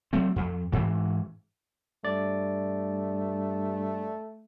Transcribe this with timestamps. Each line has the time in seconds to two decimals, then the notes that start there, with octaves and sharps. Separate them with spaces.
0.13 F#3 A3 C4
0.36 F2
0.72 G#2 E3
2.05 G2 A3 D5